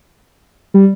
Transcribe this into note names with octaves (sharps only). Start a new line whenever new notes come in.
G3